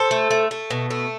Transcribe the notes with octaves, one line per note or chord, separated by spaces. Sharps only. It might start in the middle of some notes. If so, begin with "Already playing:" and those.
Already playing: A4 C5
A3
A3
A3
B2
A3